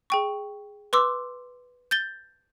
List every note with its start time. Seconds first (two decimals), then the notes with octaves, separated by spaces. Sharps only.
0.10 G#4 G5 C#6
0.93 B4 C6 D6 E6
1.91 G6 A6 G7